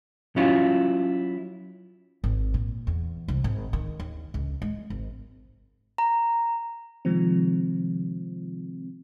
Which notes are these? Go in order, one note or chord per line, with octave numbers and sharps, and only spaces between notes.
F#3 C#4 E4 F4
G#1
A#2
E2
C2
G#1
D#3
D#2
C#2
G#3
G#1
A#5
C3 D#3 F3 G#3 C4